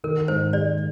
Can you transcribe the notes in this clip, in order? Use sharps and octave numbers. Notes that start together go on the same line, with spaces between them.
D#3 A#4
G#2 C5
G#3 D5